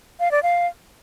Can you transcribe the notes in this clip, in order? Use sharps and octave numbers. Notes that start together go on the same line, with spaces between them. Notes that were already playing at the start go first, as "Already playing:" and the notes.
F5
D5
F5